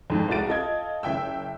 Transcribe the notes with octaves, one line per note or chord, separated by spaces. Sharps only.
F2 G#2
C2 G#3 F#4 A6 D7
F4 A4 D#5 G#6
F#1 E5 G5 E6